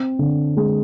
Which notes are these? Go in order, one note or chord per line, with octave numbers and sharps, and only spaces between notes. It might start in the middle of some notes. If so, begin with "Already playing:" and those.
Already playing: C4
D3
G#3